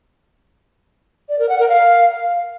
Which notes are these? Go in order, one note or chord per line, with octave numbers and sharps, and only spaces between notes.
D5
A#4
F#5
A#4
F5